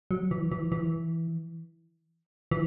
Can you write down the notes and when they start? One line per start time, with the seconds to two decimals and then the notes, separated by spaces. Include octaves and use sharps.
0.11 F#3
0.31 E3
0.52 E3
0.72 E3
2.51 E3